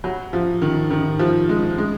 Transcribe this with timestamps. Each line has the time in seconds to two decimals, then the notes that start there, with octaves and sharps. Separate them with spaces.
0.04 F#3
0.33 F3
0.62 D#3
0.91 D#3
1.19 F3
1.49 G#3
1.78 G#3